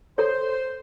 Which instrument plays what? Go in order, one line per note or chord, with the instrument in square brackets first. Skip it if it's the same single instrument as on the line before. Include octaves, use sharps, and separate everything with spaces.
[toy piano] A4 C#5 [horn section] C5